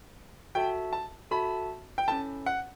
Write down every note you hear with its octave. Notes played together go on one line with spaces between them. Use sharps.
F#4 A4 E5 G5 A5
A5
F#4 A4 E5 A5 B5
G5
C#4 E4 A4 A5
F#5